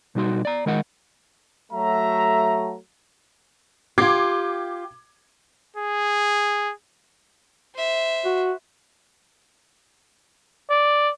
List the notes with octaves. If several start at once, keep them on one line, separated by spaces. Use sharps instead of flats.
B2 G3 D#4 F#4 C6
D5 A#5
D#3 G#3 A#4 D#5 F#5
F#3 A3 E5 A#5
F4 G4 D6 G#6 C7
G#4
C5 E5
F#4
D5